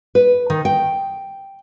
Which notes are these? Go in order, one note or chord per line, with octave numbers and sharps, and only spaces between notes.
B4
D#3
G5